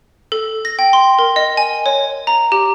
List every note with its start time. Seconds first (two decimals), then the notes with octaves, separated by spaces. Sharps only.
0.32 A4
0.65 A#6
0.79 G5
0.93 C6
1.19 A#4
1.36 D#5
1.57 G#5
1.86 C#5
2.27 A#5
2.52 G4